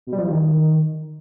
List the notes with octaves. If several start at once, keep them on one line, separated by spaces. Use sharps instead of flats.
B2
G3
F3
E3
D#3